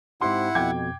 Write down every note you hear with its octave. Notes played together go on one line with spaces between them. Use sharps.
G#2 C4 E4 G4 F#5 C6
F2 B2 G5 D6 G#6